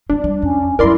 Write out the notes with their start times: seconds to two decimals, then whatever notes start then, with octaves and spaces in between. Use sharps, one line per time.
0.10 G#3 C4 D4
0.24 G3
0.42 F2 C#4
0.79 G2 F#3 E4 A#4 D5 C6